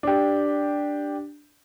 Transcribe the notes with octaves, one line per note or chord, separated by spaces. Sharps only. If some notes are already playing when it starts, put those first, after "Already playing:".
D4 G4